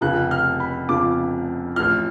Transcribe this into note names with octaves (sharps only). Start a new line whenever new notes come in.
F1 F2 C#3 F3 F#6
F6
B5
F1 F2 C#3 F3 D6
A1 A2 F3 F6